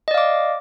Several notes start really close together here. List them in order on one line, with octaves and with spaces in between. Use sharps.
D#5 D5 F5 D6